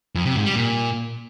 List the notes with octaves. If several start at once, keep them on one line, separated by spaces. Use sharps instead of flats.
F2
C3
G#2
G3
A#2